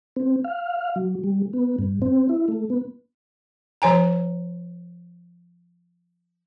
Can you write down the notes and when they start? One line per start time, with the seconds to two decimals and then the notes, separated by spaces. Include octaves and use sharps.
0.16 C4
0.44 F5
0.79 F5
0.96 F#3
1.24 G3
1.53 B3
1.79 G2
2.02 C4
2.29 E4
2.48 A3
2.70 B3
3.82 F3 C#5 G#5 A#5